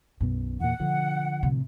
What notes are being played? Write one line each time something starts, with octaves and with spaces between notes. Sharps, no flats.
B1 F#2 B2
E2 A#2 F#5
B2 D3 F3
A2 C3